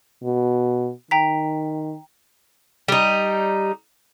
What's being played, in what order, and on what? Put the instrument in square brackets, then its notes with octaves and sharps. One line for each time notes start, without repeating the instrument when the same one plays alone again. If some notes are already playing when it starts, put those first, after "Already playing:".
[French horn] B2
[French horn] D#3 [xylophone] G5 A#5 B6
[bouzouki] G3 D#4